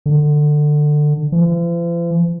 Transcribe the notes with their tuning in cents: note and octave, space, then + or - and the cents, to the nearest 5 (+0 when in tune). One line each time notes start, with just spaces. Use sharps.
D3 +20
F3 -45